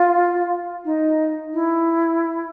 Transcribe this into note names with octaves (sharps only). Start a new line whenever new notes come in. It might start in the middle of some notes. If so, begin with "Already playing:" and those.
Already playing: F4
D#4
E4